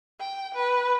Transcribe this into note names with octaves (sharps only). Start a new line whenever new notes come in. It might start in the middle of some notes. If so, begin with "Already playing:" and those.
G5
B4